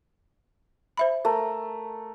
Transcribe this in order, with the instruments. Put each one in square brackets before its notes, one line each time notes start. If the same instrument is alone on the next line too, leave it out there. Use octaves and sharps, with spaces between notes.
[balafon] C5 E5 B5
[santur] A3 A#4